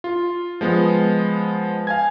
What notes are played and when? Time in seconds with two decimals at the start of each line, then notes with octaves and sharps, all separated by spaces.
0.04 F4
0.61 F3 G#3 B3
1.87 F5 G#5 G#6